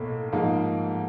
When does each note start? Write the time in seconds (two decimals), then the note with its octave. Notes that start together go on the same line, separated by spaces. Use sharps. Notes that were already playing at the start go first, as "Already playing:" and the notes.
Already playing: B1 A2 A#3
0.32 G#2 F3 A#3 D#4